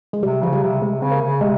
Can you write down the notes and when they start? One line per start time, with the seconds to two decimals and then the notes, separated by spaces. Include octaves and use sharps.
0.13 G#3
0.23 C3 G3
0.42 C#3 F3
0.53 G3
0.63 C3
0.82 C3 G#3
1.01 C#3 C4
1.12 A#3
1.22 C#3
1.41 C3 G#3